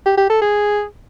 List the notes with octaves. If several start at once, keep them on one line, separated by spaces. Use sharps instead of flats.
G4
G4
A4
G#4